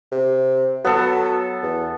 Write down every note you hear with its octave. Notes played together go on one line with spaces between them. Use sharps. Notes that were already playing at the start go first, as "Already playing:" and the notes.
C3
F#3 B3 A4
E2